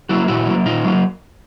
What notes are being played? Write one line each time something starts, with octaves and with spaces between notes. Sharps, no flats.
F#3 A#3 E4 F#4
A#2 E4 F#4
F#3 A#3
A#2 D#4 F4
F#3 A#3